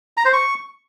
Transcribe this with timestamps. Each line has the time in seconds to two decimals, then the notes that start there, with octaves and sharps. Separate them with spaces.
0.17 A#5
0.25 C5
0.33 C#6